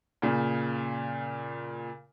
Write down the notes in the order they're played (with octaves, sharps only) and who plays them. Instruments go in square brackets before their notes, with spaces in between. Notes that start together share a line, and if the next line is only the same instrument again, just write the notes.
[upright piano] A#2 C#3